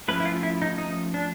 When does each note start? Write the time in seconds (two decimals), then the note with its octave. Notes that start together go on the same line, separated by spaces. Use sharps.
0.08 F3 A3 C#4 B4
0.20 E4
0.25 F4
0.43 E4
0.62 D#4
0.78 D#4
1.14 D4